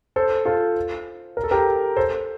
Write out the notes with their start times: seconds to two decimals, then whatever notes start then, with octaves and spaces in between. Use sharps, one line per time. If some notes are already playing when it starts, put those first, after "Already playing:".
0.16 A4 C5
0.45 F4 A4
1.37 A#4
1.44 A4
1.51 G4 A#4
1.97 A4 C5